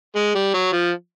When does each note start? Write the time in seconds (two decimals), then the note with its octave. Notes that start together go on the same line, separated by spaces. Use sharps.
0.16 G#3
0.35 G3
0.54 F#3
0.72 F3